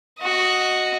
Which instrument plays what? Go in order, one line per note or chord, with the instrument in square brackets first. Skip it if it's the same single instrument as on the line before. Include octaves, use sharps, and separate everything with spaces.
[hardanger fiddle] F#4 D#5